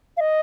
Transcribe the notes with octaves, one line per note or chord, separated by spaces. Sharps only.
F5
D#5